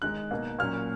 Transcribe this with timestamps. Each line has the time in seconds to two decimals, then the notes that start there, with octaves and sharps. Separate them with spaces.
0.02 D#3 G#3 D#4 F#6
0.31 B2 A#3 D#4
0.59 A#2 F#3 A#3 C#4 F6